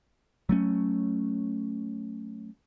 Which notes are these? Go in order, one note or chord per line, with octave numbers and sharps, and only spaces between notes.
F#3 A3 C#4